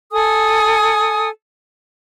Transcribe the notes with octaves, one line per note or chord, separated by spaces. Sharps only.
A4 G#5 D#6